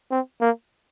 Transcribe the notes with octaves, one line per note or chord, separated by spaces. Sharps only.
C4
A#3